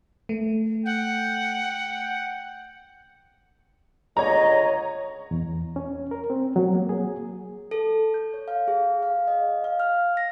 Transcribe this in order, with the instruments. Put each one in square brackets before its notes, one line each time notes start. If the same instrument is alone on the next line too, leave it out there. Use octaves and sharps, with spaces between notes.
[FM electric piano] A3
[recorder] F#5 [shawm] G5
[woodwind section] C#2 D3 D#5 [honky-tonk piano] C#5 A#5
[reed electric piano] E2
C#4
A#4
C4
F#3
A#3
G#4
[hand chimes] A4
G6
C#5
F5
G#4
F5
D#5
F5
F6
A#6